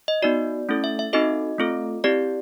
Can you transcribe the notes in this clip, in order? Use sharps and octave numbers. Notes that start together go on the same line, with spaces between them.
D#5
B3 D#4 F#4 D5
A3 C#4 E4 A4
E5
E5
C4 D#4 F#4 A4 D#5
A3 C4 F4 A4
C4 E4 G4 D5